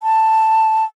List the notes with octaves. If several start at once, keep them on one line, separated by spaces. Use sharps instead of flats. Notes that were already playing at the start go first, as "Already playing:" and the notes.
A5